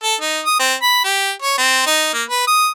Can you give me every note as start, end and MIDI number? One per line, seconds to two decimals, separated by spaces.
0.03 0.15 69
0.21 0.40 63
0.46 0.55 87
0.60 0.74 60
0.82 1.02 83
1.05 1.32 67
1.42 1.57 73
1.58 1.86 60
1.87 2.09 63
2.14 2.23 58
2.29 2.44 71
2.47 2.68 87